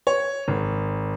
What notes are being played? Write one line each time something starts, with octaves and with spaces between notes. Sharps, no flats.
C#5
G#1